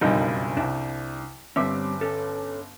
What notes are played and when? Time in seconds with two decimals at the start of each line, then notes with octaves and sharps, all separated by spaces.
0.01 F#1 B1 F2 D3 G3 D#4 A#4 D#5
0.57 C2 D4
1.56 G1 G3 C4 C#4 E5 D6
2.01 C#4 A4